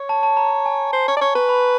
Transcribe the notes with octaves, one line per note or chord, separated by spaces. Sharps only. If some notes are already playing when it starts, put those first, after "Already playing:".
Already playing: C#5
A5
A5
A#5
A5
G#5
C5
C#5
D5
C#5 C#6
B4
B5